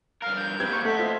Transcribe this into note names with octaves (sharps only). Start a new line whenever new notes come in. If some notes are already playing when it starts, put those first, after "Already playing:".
G2 A#4 F5
G6
A#3 C4 G4 B4 G#6
C#6
A3 D#5 F#5 B6
F4 C5 E5